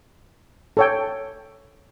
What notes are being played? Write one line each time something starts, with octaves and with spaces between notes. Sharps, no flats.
A4 C#5 G5